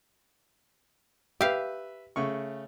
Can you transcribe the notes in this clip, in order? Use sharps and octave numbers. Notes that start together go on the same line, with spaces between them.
G4 B4 E5 F5
C#3 A3 C#6